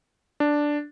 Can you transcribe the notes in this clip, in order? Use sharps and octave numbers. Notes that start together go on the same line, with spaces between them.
D4